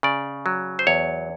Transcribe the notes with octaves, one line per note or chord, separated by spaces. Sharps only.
C#3 D5
F#3
C5
E2 C#5